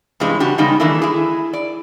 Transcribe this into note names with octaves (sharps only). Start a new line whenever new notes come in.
G2 C3 E3 G#3 C#4
C#3 D4 F#4 G4
C#3 G3 G#3 B3 D#4
D#3 E3 A3 A#3 D4 E4
E4 G#4
D5